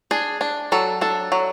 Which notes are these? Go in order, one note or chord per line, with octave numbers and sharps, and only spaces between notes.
D4 G#4
D4
F#3 A4
D4 A4
F#3